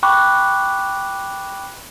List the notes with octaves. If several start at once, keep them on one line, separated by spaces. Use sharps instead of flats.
G5 B5 C#6 D6 F#6